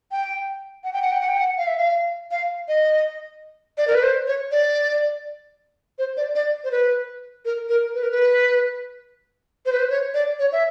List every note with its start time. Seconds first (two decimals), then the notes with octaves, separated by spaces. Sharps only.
0.11 G5
0.84 F#5
0.93 G5
1.02 F#5
1.12 G5
1.21 F#5
1.28 G5
1.38 F#5
1.58 F5
1.67 E5
1.78 F5
2.31 F5
2.68 D#5
3.78 D5
3.88 A#4
3.95 B4
4.03 C5
4.27 C#5
4.51 D5
5.99 C5
6.17 D5
6.35 D5
6.64 C5
6.71 B4
7.45 A#4
7.69 A#4
7.94 B4
8.03 A#4
8.11 B4
9.66 C5
9.72 B4
9.79 C5
9.90 C#5
10.14 D5
10.39 C#5
10.52 E5